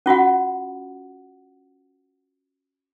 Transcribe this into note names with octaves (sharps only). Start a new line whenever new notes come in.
C#4 F4 F#4 F#5